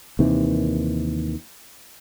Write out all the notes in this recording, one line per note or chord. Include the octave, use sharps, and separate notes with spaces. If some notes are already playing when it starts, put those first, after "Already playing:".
D#2 C3 D#3 E3